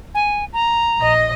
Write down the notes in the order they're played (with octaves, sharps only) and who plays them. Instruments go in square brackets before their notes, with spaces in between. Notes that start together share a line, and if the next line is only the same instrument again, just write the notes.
[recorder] G#5
A#5
[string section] A#1 D#5